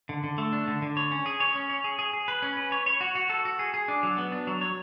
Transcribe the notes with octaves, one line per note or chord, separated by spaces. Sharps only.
D3
D3
A3
D4
D3
D3
C#5
C#4
G#4
C#5
C#4
C#5
G#4
G#4
G#4
B4
C#4
B4
C#5
C#5
F#4
F#4
A4
F#4
G#4
G#4
D4
F#3
B3
D4
F#3
C#5